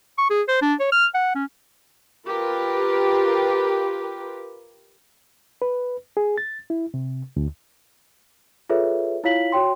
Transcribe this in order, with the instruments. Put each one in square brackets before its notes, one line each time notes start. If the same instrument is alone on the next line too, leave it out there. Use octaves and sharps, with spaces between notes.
[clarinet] C#6
G#4
C5
D4
C#5
F6
F#5
C#4
[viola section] F4 G4 A#4 B4
[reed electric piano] B4
G#4
A6
E4
C3
D2
[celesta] F4 G#4 A4 B4 C#5 E5
E4 F4 C#5 F5 B6 F#7
F#4 C#5 G5 C6